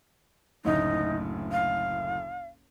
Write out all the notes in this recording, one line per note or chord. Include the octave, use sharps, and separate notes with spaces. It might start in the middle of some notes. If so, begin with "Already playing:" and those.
F#1 D2 A2 D#4
F5